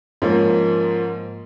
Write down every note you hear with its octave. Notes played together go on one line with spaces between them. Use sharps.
G#2 F3 A#3 C#4